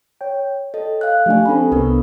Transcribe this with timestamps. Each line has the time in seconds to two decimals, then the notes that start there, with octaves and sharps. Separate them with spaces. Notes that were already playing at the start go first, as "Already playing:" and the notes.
0.21 C#5 G5
0.74 A4 D#5
1.01 F5 F#6
1.26 F3 A3 D4 G4 G#5
1.45 C4 D4 G4 A4 B5
1.72 C2 B3 D4 A#4